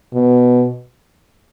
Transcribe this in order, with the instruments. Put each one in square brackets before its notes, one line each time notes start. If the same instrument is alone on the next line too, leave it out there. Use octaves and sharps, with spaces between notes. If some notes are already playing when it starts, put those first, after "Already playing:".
[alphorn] B2